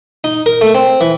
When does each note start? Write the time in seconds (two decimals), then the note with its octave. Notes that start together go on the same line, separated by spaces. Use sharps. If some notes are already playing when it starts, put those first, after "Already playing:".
0.24 D#4
0.46 A#4
0.61 A3
0.75 C4
1.01 E3